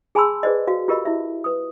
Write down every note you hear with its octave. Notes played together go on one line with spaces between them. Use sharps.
G#4 G#5 A5 B5 C6 E6
G#4 B4 C5 D5 D#5
F#4 F5
F4 G4 A#4 D#5 B5
E4 E5
B4 D#6